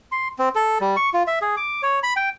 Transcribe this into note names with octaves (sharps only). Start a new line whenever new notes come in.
C6
C4
A4
G3
C#6
F4
E5
G#4
D6
C#5
B5
G5